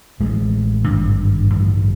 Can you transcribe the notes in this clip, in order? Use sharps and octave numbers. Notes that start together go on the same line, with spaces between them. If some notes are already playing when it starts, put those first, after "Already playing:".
A1 A2 G#3
G#1 G2 D3
A1 G2 D3 G3